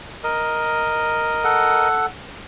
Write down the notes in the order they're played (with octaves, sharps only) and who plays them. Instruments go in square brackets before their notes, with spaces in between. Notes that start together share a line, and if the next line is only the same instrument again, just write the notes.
[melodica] A#4 D#5
[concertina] A4 F#5